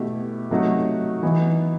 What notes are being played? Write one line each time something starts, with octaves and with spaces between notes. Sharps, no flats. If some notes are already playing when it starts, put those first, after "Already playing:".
Already playing: B2 A3 E4 G4
C3 F#3 A3 D#4 F#4
E3 B3 D#4